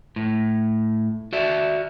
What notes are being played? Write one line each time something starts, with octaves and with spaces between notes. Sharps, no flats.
A2
F#4 D5 E5